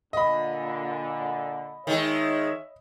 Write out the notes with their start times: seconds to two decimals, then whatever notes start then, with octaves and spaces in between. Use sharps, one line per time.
0.13 A#2 D3 D#5 B5
1.87 D#3 G#3 C#5 E5